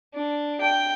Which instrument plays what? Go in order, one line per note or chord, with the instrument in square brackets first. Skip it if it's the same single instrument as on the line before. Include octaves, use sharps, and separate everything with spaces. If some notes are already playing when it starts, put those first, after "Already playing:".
[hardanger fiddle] D4
G5